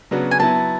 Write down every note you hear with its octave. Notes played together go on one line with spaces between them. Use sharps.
C#3 F#3 B3 D4 F#4
G#5
F#3 B3 E4 A5